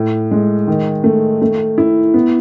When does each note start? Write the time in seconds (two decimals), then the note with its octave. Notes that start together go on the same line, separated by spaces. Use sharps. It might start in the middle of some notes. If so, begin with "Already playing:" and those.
Already playing: A2
0.31 G#3
0.67 D#3
1.04 A3
1.42 A3
1.78 E4
2.14 B3